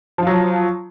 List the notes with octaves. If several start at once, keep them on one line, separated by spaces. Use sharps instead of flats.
F3 F#3 F4